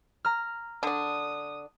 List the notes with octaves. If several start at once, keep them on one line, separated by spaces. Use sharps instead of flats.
A#5 F6
D3 D4 D#6